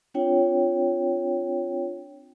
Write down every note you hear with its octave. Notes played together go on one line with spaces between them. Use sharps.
C4 D4 F4 C#5 G5